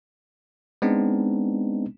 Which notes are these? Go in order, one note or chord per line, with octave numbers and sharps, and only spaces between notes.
G#3 B3 C4 D4 D#4